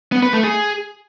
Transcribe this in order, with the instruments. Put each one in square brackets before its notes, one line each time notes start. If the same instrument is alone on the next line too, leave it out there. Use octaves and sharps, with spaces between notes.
[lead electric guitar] B3
B4
A3
G#4